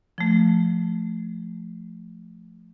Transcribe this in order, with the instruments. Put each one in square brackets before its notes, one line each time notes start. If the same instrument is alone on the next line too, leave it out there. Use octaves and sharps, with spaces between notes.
[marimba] F3 A3